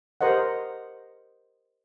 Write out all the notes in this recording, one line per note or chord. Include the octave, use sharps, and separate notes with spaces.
G4 A#4 C5 D#5 F#5